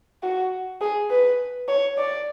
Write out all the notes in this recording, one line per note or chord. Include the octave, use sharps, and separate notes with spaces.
F#4
G#4
B4
C#5
D5